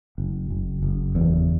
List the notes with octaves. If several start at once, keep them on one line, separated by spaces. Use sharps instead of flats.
F#1
F#1
F#1
E2